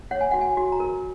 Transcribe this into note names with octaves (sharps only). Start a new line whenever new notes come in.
C#5 F#5
G#5
F#4 F#5
G#5
F#4
A#5
A#4